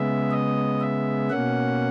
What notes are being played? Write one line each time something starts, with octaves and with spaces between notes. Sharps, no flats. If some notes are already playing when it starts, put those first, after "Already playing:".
Already playing: C#3 G#3 B3 E5
D#5
E5
B2 A#3 C#4 F#5